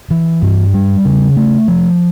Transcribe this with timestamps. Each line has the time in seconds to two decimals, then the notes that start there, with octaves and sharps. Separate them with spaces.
0.11 E3
0.42 G2
0.74 G3
1.05 C#3
1.37 A3
1.68 F3